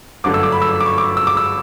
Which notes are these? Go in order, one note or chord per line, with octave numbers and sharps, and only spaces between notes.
G1 F#2 D3 A3 D6
E6
D6
B5
E6
D6
C#6
D6
E6
D6
E6